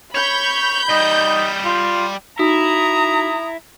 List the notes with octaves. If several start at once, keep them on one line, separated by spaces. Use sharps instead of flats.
C#5 B5 G6
G3 D#4 D#5
F4
D#4 E4 F#4 A#5 D#6